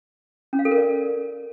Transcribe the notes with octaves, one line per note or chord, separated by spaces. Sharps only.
C#4
F5
A4
A#4
D5